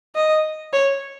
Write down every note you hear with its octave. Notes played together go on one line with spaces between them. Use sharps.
D#5
C#5